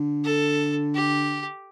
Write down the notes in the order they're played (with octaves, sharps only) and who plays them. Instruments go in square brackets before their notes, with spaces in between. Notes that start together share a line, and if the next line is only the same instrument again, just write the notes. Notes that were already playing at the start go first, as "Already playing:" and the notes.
Already playing: [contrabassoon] D3
[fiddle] A4
G4